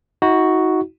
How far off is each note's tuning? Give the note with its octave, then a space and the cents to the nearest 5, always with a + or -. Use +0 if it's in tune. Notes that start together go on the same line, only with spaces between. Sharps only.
D#4 +40 F#4 +0